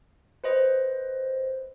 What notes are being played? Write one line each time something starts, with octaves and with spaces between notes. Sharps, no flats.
B4 C5 D#5